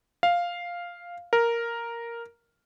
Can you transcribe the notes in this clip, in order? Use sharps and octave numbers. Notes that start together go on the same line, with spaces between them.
F5
A#4